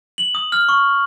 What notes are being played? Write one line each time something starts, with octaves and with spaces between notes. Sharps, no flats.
F#7
D#6
F6
C#6